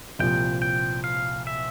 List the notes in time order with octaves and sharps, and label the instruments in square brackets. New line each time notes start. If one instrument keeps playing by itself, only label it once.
[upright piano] C2 A#2 F3 [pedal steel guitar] G5
[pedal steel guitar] G5
F5
E5